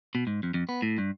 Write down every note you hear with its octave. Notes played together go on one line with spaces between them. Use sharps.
B2
G#2
F2
F2
B3
A2
G2